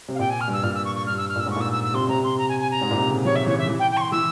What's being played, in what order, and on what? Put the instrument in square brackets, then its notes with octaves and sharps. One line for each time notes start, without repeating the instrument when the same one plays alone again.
[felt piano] C3
[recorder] F5
[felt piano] A#2 [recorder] G5
[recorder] G#5
F6
[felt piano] G2 [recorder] E6
[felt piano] A#2 [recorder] F6
[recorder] E6
C#6
C#6
[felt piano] G2 [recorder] F6
[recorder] E6
F6
[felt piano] A#2 [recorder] E6
[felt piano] G#2 [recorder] C#6
[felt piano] A#2 [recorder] E6
[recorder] E6
E6
[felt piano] C3 [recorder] C6
[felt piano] C3 [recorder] A#5
[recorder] C6
A#5
G#5
G#5
A#5
[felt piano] G#2
A#2
C3
C#3
[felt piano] F3 [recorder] C#5
[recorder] E5
[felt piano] E3 [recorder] C#5
[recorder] E5
[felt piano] E3
[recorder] G5
G5
C#6
C6
[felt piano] E3 [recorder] E6